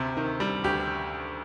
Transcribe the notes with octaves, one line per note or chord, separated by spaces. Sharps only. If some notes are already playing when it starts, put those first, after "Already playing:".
Already playing: D2 C3
D#3
G3
D2 G4